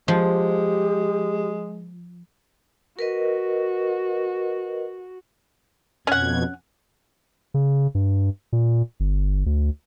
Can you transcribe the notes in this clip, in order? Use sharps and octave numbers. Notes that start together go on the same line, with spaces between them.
F3 G#3 G4
F#4 A#4 B4 D#5
F2 B2 C#4 F#5 G#6
C#3
G2
A#2
G1
D2